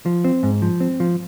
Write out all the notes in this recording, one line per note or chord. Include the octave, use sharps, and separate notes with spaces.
F3
C4
G#2
F3
C4
F3